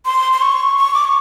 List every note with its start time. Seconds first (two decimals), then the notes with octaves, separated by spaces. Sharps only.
0.06 C6
0.33 C6
0.41 C#6
0.78 C#6
0.94 D6
1.04 C#6